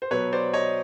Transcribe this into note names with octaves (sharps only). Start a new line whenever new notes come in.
C5
B2 F#3 B4 C#5
C5 D5
C#5 D#5